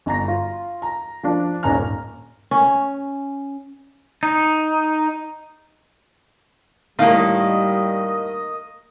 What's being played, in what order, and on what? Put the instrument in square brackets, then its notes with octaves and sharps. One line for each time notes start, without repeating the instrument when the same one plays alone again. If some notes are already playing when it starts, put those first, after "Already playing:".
[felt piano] G1 A#5 A#6
F4
A#5
F3 D4
D#1 G#1 C#4 A#5 F6
[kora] C#4
[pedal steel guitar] D#4
[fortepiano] A2 F5 [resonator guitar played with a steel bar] D#3 A#3 [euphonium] G3 [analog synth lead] D#5